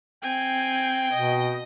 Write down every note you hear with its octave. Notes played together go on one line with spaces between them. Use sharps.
C4 G5 G#5
B2 D#5